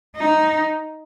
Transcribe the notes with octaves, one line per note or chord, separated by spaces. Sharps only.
D#4